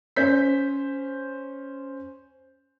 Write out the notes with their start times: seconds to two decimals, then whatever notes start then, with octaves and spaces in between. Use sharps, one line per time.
0.16 C#4 C5 G6 B6